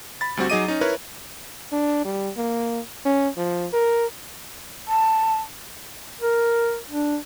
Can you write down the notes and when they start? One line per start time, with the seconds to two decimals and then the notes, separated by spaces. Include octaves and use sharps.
0.21 B5 A6
0.37 D2 G3 C4 F#4
0.50 F#3 D#4 G#4 D#5 D6 D#7
0.68 C#4 D#4
0.81 E4 A#4 B4 C#5
1.72 D4
2.05 G3
2.37 A#3
3.06 C#4
3.37 F3
3.73 A#4
4.87 A5
6.21 A#4
6.89 D4